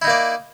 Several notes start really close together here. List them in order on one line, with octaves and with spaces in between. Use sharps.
E4 D#4 A#3 D5